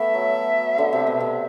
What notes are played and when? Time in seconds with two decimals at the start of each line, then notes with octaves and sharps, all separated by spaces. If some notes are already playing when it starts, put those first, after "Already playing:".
Already playing: A3 B3 E5
0.14 F#3
0.78 D3
0.93 C3
1.07 B2
1.20 C3